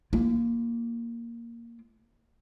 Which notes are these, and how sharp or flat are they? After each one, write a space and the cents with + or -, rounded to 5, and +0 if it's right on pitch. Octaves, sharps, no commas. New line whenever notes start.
A#3 +0 F4 -45